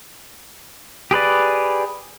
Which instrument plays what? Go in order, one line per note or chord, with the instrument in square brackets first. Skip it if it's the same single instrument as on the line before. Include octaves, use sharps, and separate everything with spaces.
[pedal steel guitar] G4 G#4 B4 D5